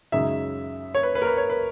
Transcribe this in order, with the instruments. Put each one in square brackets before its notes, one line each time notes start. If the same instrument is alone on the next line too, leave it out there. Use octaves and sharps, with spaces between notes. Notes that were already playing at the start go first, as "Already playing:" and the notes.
[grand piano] F#2 C#3 G#3 D#4 E5
C#5
B4
B4
A#4
B4
C#5
B4